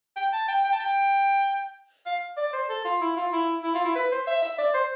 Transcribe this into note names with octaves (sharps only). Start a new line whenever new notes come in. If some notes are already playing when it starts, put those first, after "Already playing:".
G5
A5
G5
G5
A5
G5
F5
D5
C5
A4
F4
E4
F4
E4
E4
F4
E4
B4
C5
E5
E5
D5
C5